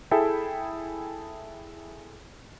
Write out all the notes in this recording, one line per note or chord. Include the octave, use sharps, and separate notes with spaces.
E4 G#4 A4 E5 G5